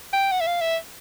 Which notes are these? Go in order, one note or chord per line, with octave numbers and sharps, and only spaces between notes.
G5
F#5
E5
F5
E5